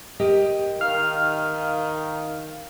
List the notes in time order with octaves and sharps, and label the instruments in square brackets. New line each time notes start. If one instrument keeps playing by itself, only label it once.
[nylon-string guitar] G4 A#4 D#5
[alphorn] D#3 [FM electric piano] F5 F6